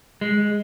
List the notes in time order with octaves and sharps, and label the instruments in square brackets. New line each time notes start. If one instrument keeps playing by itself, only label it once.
[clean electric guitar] G#3